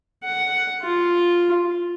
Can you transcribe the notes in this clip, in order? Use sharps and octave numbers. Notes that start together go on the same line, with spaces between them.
F#5
F4